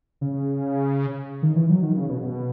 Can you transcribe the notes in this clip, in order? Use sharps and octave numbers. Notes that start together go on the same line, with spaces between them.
C#3
D#3
E3
F#3
D#3
C#3
B2
B2